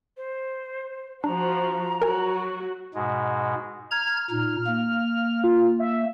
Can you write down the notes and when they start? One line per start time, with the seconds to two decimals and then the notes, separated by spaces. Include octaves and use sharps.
0.17 C5
1.24 F3 D4 F#4 A#5
2.02 F#3 F#4 A#4 G#5
2.94 G#2 B2 G#3
3.91 A#5 F6 G#6
4.30 A#2 D#4
4.66 A#3
5.44 F4
5.79 E5